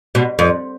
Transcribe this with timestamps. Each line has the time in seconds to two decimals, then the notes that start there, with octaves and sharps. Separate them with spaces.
0.15 B2
0.39 F2